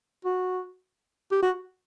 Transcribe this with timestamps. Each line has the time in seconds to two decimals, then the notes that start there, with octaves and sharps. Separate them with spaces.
0.25 F#4
1.31 G4
1.42 F#4